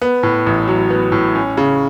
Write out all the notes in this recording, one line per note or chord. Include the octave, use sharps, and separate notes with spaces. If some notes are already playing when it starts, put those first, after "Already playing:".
B3
A2
A1
F#3
B3
A2
C#4
C#3